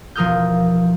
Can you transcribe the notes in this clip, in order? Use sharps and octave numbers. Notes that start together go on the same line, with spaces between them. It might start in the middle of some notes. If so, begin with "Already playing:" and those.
E1 F3 A#4 D#6 F6 G6